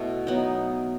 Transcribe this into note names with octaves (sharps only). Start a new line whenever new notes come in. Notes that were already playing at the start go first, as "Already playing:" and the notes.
Already playing: B2 A3 E4
F#3 B3 D#4